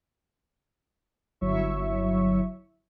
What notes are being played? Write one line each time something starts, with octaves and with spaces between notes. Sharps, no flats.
G1 F#3 E4 C#5 E5 C#6